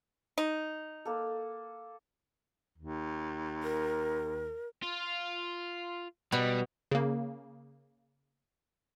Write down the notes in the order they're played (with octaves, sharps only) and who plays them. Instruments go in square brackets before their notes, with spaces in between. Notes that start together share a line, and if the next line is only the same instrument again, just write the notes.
[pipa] D#4
[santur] A#3 A4
[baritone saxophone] D#2
[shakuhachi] A#4
[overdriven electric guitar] F4
[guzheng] B2 [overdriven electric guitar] G3
[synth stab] C#3 A#3